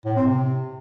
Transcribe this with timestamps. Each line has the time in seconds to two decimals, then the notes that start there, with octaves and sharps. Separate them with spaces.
0.05 A2
0.16 C4
0.27 C3